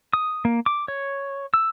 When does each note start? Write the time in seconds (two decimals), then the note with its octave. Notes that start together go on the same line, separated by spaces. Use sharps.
0.13 D#6
0.45 A#3
0.66 D6
0.88 C#5
1.54 E6